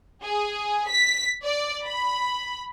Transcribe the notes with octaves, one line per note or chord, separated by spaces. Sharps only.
G#4
B6
D5
B5